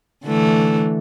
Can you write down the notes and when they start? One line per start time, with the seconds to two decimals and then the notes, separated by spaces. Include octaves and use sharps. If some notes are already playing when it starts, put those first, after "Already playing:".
0.24 D3 E3 A3